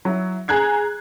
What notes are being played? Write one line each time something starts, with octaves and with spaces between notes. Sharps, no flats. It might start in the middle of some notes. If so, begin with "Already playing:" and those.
F#3 E4
G#4 A#5 F#6 G#6 C7